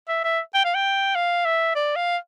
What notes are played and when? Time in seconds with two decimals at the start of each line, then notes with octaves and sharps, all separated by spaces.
0.08 E5
0.24 E5
0.54 G5
0.64 F5
0.75 G5
1.15 F5
1.45 E5
1.75 D5
1.96 F5